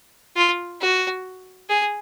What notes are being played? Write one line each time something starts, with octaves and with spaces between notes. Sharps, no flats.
F4
F#4
G#4